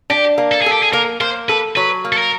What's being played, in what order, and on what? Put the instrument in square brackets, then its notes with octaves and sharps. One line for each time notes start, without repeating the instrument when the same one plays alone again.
[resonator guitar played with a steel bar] D4 [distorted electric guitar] G4
[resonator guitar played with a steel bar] A#3
[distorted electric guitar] A4
[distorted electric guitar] G#4 [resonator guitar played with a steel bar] A4
[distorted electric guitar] G4
G#4
[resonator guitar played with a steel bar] A#3 [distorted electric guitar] A#4
[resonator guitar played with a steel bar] A#3 [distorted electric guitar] C5
[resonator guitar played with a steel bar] A4 [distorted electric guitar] B4
[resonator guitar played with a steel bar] F#3 [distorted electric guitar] B4
[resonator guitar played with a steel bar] A#3
[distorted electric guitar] A4
A#4